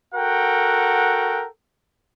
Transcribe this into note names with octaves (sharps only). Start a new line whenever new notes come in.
F#4 A4 A#4 F#5 G5